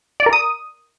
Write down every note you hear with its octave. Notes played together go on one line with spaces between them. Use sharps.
D5
A#4
D#6